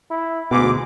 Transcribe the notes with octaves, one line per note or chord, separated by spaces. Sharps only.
E4
D2 G#2 B2 D6